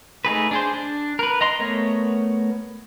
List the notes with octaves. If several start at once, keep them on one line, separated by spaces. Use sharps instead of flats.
A3 D#4 G#4 B4
D4 G#4 C5
D4
A#4 B4
D#5 A#5 C6
A3 B3 A#4 C#5